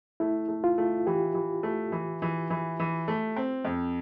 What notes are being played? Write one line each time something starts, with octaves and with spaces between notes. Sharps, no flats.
A3 E4
A3
F4
A3
E3 G4
E3
A3
E3
E3
E3
E3
A3
C4
F2